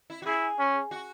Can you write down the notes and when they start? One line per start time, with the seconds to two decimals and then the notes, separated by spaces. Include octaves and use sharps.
0.10 E4
0.22 F#4
0.26 E4 G#4
0.59 C#4
0.91 F#4